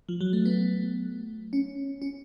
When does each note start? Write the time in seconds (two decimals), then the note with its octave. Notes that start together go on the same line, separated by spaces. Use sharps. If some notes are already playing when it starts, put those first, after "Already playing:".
0.09 F3
0.21 F#3
0.33 A3
0.46 B3
1.53 C#4
2.02 C#4